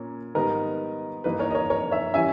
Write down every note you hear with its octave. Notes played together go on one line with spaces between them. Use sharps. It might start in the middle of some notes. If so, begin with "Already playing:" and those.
Already playing: A#2 A#3 C#4
G#2 D#3 G3 B3 D#4 A#4
G2 E3 A#3 D#4 B4
A#4 C#5
D#5
A#4 C#5
A#4 C#5
C#5 E5
E3 G3 C#4 E5 G#5